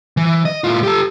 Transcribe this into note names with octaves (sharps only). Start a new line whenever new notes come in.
E3
D#5
A2 F4
G4 A4